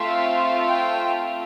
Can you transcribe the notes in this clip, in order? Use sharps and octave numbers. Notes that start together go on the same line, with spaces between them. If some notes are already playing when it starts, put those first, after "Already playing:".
Already playing: A3 C4 F4 A4 E5
G5